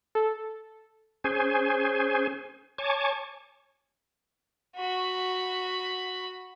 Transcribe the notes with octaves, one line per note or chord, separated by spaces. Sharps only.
A4
C#4 G#4 C5 G#5
C#5 G#5 A5 C#6 D6
F#4 B5